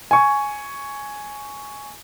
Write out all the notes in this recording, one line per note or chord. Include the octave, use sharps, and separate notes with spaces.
G#5 C#6